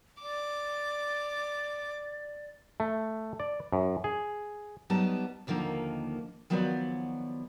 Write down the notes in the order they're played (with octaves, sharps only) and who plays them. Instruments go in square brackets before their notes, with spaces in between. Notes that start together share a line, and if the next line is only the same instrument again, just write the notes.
[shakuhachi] D5 [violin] D6
[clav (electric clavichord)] A3
D5
F#2
G#4
[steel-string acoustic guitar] F#3 G3 B3 D#4 A5
D#2 D3 D#3 F3 A#3
D#3 F3 F#3 B3 C#5 D5